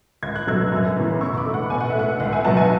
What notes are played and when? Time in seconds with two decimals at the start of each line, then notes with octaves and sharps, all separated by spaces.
0.22 C#2 G#6
0.36 F#6
0.47 B2 F#3 A3 E6 G#6
0.72 F#2
0.97 C#3 E3 B3
1.21 B2 C#6 E6
1.37 B5 D6
1.45 A3
1.54 F#5
1.70 B2 G#5
1.80 F#5
1.90 E5
1.95 A3 F#5
2.20 C#2 F#5
2.32 E5 G#5
2.45 B2 F#3 B3 F#5 A5
2.57 E5 G#5